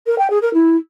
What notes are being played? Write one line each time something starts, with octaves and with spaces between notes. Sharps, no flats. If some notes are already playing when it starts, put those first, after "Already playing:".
A#4
G5
G#4
A#4
E4